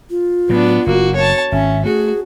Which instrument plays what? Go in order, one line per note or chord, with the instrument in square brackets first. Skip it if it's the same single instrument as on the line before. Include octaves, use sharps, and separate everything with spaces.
[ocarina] F4
[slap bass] A2 F#3 [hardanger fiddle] B3 D4
[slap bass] F#1 [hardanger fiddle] A#3 F#4
[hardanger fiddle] C#5 A5
[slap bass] G#1 [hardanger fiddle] C#4 [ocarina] E5
[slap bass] A3 [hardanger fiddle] F#4 [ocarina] G#4